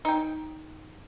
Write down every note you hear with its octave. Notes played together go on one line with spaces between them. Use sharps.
D#4 G5